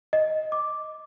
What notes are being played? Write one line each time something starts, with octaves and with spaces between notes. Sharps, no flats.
D#5
D6